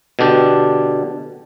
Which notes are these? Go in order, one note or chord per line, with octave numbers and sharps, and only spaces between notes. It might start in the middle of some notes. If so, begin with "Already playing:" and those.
B2 D3 D4 G4